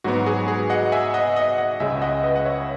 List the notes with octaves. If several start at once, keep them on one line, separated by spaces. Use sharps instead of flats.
G#2 F#3 B3 F#4
G#4
G#4
D#5 F#5
E5 G#5
D#5 F#5
D#5 F#5
D#5 F#5
C#2 C#3 G#3 E5 G#5
D#5 F#5
B4 D#5
F#5
C#5 E5